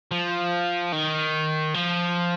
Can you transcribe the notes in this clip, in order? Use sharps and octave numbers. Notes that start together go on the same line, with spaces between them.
F3
D#3
F3